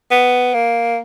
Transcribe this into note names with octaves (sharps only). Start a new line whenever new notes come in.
B3
A#3